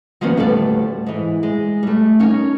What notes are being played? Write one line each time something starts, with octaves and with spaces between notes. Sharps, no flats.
D#3 F3 F#3 A#3 B3 C#4
D2 A2 G3 A4 B4 D5
G#2 E3
G#3
G3 A3
C#4 D#4 A#4 C#5